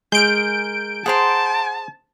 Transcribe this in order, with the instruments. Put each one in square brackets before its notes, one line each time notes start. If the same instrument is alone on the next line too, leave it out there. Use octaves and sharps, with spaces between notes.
[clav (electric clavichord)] G#3 [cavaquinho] G#4 A#4 [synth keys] G6 D7
[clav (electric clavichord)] G#4 C5 [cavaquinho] F#5 A#5 C6 [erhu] A5